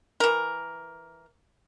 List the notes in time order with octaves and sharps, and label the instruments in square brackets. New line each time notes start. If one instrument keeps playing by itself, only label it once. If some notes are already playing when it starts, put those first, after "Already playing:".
[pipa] E3 A#4